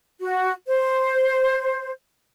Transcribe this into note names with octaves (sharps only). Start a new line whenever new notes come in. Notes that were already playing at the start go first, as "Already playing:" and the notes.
F#4
C5